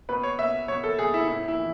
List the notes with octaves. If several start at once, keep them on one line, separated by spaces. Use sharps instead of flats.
B2 B4
C#5
B2 E5
B2 C#5
A4
B2 G#4
E4
A2 E4
E4
E3